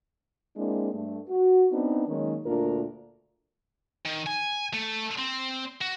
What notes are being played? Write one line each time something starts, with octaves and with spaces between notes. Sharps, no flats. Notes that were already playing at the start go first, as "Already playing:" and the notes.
G#3 A#3 C4 D4 E4
G2 A3
F#4
B3 C4 D4 D#4
D#3 F#3 G#3 A#3 C#4
D2 A#2 D4 F4 A#4
D#3
G#5
A3
C4
F#4